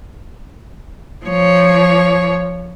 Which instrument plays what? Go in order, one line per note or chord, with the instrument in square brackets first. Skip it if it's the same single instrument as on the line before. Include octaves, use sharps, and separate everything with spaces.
[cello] F3 C#5